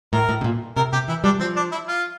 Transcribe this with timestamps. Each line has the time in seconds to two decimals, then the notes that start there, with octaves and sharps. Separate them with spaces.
0.13 A2 A#4
0.29 A2
0.41 C3
0.44 A#2
0.77 C3 A#4
0.93 C3 G4
1.08 E3 E4
1.24 G3 D4
1.40 F3 C4
1.56 D4
1.72 E4
1.88 F4